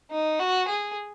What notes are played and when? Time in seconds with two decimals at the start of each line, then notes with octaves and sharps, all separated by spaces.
0.11 D#4
0.40 F#4
0.68 G#4